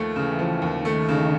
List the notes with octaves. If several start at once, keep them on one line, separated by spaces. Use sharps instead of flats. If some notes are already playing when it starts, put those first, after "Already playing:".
Already playing: D#2 F3 A3
C#3 E3
F3
D#2
D#3 A3
C#3